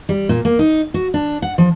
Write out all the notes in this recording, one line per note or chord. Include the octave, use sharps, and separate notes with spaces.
G3
A#2
A#3
D#4
F#4
D4
F#5
F3